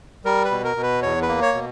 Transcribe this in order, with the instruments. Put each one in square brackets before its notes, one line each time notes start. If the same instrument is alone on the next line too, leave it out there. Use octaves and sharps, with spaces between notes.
[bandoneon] G3 A#4
B4
B2
A#4
B2
B4
E2 C#5
B4
A#3
C#5
B2